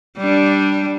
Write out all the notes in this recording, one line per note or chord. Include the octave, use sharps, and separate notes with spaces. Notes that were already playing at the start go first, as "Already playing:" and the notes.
G3 D4